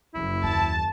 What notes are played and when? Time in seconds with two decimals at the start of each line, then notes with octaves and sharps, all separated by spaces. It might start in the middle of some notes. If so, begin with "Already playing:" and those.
0.14 F#1 E4
0.44 D#2 A5